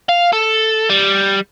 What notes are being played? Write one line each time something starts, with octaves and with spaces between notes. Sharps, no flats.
F5
A4
G3